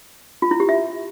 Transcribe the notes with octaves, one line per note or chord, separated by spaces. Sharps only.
F4
E4
G4
E5